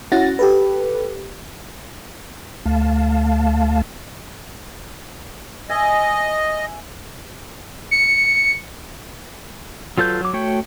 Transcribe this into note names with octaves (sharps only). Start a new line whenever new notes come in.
C#4 E4 F#4 F#5 A6 A#6
G4 A4 B4
D2 A3 F5 A5
D#5 E5 G#5
C#7
F#3 F4 A4 B4 G6
F#3 D6
A3 F#4 C#5 G5